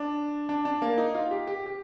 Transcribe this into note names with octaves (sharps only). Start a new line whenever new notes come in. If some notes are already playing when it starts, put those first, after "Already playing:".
Already playing: D4
D4
D4
A#3
D#4
F4
G4
G4
G4